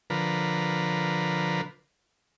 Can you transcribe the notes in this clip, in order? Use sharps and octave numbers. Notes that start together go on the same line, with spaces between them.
D3 F3 A#4 B4